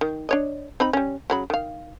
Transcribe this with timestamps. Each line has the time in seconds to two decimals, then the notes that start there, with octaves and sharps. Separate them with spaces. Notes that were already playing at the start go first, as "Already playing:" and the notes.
0.01 D#3
0.29 D4 C#5 D#5
0.80 C4 D#4 B5
0.93 G3 C#4
1.30 C#3 F#3 B5
1.50 D#3 F5